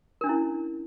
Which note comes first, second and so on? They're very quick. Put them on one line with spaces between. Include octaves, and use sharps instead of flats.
A#4 D4 C#4 E4